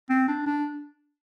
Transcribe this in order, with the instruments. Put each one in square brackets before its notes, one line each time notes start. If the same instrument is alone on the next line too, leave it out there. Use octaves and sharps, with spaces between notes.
[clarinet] C4
D4
D4